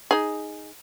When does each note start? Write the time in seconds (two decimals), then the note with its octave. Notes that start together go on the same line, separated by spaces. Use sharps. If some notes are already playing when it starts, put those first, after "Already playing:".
0.11 D#4 G#4